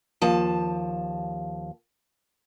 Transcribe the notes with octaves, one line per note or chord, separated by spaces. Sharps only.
D#2 F3 A5